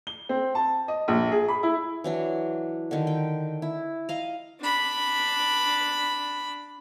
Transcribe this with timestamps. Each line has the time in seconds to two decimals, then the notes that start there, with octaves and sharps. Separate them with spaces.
0.07 G7
0.29 C4
0.55 A5
0.88 D#5
1.08 A#1
1.32 G#4
1.48 B5
1.63 E4
2.04 E3 F#3 D4
2.91 D3 D#3
3.07 G5
3.62 E4
4.09 D#5 F5 A#5
4.60 D4 B5